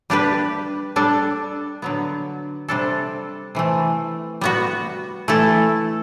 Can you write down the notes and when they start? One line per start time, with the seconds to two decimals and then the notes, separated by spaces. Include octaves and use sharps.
0.10 G3 D4 G4 B4
0.96 G3 D4 A4
1.82 D3 F#3 B3
2.68 C3 G3 D4 A4
3.55 C3 E3 A3
4.41 G3 B3 F#4
5.28 E3 A3 E4 A4